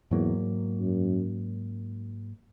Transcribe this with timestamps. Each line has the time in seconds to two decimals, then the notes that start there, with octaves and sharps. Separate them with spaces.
0.11 E2 G#2 F#3 A#3
0.80 F#2